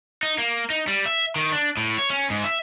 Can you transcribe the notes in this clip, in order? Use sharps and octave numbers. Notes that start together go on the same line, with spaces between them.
D#4
A#3
D#4
G3
E5
D#3
D4
A2
C#5
C#4
G#2
E5